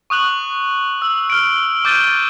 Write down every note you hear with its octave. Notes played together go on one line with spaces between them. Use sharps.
C#6 D#6 F#6 F#7
E6
F6 D7
D6 G6 A6 D#7 G7